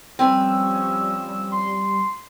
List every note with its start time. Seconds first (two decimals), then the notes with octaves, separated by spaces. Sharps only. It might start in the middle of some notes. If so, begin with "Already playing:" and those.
0.19 F3 G3 C4 C#4 B4 G#5 E6
1.52 C6